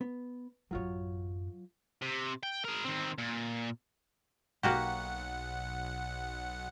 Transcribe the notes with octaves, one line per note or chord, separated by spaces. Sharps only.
B3
A1 F#2 F#3 F4 C#5
C3
G5
G#4 A#4
D#3 C4
A#2
B1 A#3 F#4 G4 F#5